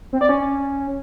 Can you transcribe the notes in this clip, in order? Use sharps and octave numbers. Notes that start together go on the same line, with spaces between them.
C4
D5
C#4